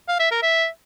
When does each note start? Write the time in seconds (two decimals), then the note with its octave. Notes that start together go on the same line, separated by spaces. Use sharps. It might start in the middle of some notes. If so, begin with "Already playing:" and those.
0.09 F5
0.20 E5
0.32 A#4
0.43 E5